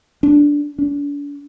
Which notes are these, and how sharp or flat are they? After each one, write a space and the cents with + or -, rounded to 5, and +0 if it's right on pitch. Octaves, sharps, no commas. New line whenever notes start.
D4 -10
D4 -40